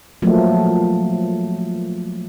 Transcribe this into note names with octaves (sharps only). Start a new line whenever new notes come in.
F3 F#3 A3 A#3